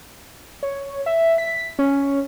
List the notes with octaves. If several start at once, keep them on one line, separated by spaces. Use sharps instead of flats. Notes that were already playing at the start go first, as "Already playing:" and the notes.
C#5
E5
B6
C#4